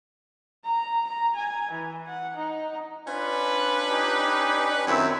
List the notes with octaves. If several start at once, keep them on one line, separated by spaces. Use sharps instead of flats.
A#5
A#5
G#5
E3
F#5
D#4
C#4 D4 F4 B4
D#4 G4
F#2 D#3 C4 C#4 E4 E5